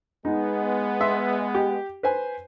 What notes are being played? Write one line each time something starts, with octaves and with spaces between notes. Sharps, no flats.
G#3 B3 D#4
E5 C6
G4
B4 C5 G#5